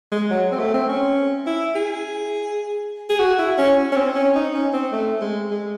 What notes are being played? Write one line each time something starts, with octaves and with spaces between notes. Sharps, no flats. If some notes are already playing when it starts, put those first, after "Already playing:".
G#3
F#3
C4
A3
C4
C#4
E4
G#4
G#4
F#4
E4
C#4
C#4
C4
C#4
D#4
C#4
C4
A3
G#3
G#3